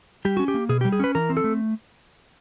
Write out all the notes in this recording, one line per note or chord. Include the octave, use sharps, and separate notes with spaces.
G3 G4
C#4 F#4
G4
A#3
B2 G#4
G4
G3
G#4
C#4 B4
E3 A#4
C4
A4
A3